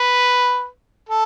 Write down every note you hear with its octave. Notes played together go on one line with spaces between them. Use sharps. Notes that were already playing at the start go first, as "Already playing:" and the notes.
Already playing: B4
A4